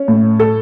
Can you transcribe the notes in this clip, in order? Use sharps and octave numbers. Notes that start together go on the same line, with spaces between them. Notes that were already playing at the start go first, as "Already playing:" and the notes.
Already playing: C#4
A2
A4